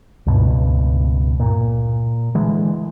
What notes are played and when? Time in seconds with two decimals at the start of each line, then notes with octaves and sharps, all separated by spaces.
0.27 C#2 G2 B2
1.40 A#2
2.35 D3 E3 G#3